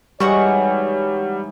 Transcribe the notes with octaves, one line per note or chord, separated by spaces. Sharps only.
G#2 E3 G3 F#4 G#4 C#5 F#5 C#6